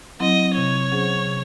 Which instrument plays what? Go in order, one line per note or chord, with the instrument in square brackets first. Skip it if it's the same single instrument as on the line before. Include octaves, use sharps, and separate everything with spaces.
[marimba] F#3 C4 E4 [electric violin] D#5
[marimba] C3 [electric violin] C#5
[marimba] F#3 C#4 G#4 C5
C3